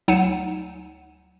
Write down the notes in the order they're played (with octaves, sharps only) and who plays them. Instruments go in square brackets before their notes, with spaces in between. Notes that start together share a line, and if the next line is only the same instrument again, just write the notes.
[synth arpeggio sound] D2 F#3 D#4 F#5 G#5 E7